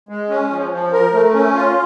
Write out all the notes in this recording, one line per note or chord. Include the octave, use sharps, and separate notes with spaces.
G#3
C#4
F3
F3
A#4
A3
C#4
F4